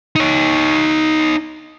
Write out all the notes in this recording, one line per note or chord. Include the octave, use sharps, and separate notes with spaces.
D#4 C#5